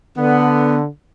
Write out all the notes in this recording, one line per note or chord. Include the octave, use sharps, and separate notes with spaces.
D3 B3